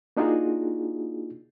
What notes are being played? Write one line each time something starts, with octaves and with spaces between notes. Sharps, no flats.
A#3 D4 D#4 F4 F#4 G#4